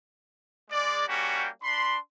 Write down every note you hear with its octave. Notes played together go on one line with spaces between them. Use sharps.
G#3 D5
G3 A#3 C#4 F#4 G4
D4 B5 C6